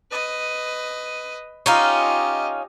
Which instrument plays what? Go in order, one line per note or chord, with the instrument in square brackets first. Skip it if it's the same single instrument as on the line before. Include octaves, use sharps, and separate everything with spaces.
[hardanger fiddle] B4 D#5
[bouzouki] C#4 D#4 F4 [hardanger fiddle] G4 D#5